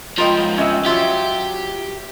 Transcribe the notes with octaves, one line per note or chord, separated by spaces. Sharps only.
C#2 F3 G3 F4 A#4 D#5 G5
C#4 B4 D#5 E5 G5
F#3 F4 G4 E5